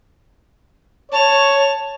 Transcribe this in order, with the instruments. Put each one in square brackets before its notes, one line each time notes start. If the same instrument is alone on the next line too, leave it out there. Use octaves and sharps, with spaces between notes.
[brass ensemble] C#5 [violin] A5 F7